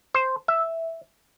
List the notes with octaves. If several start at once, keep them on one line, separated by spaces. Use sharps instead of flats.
C5
E5